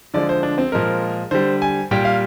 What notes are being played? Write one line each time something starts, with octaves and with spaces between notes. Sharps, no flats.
D3 F3 G#3 D5
C5
D4
C4
A#2 F3 G#3 A#4
D3 G3 C5
G#5
A#2 G3 G5
F5